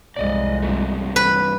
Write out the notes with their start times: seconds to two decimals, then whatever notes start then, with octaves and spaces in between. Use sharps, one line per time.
0.16 C2 F2 G#3 D5 D#5
0.62 G2 C3 A3
1.16 B4